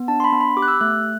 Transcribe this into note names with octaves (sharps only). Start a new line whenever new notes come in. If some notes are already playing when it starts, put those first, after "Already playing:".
Already playing: B3
D4 A5
C6
B5
B3
B5
G4 D6
F#6
E6
A3 F#6